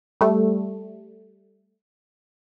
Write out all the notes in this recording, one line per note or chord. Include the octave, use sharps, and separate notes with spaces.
G3 A3